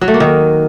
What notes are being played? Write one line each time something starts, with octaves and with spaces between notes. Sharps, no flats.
F#3
A3
A#3
D#3